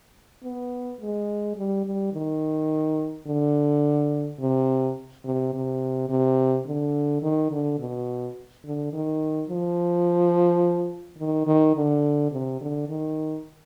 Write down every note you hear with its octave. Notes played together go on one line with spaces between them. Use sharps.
B3
G#3
G3
G3
D#3
D3
C3
C3
C3
C3
D3
D#3
D3
B2
D3
D#3
F3
D#3
D#3
D3
C3
D3
D#3